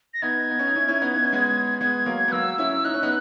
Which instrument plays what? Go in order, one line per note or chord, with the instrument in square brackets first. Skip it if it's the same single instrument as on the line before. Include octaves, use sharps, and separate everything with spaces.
[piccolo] A#6
[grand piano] B3 D#4 [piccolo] G#6
[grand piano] B3
C#4
D#4
C#4 E4
C#4 E4
B3 D#4
B3
C#4
G#3 B3
[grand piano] G#3 B3 [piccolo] G#6
[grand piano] F#3 A#3
B3
[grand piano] F#3 A#3 [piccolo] E6
[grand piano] C#4 E4
[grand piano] D#4 [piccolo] F#6
[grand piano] C#4
B3 D#4